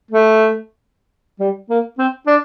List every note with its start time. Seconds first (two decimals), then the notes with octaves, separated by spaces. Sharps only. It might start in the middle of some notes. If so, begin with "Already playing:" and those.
0.11 A3
1.40 G3
1.70 A#3
1.98 C4
2.27 D4